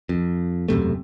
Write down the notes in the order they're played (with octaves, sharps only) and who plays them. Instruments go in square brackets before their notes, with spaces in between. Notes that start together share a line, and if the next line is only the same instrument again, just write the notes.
[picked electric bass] F2
E1 F#2 C3 A3